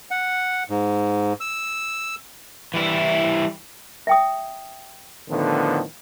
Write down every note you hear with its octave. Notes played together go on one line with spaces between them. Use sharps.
F#5
G#2
E6
E3 G3 E4
E5 G5 D#6
A2 D3 D#3 F3 B3